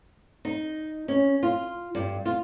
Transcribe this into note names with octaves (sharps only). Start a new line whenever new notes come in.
D#4
C#4
F4
G2
F4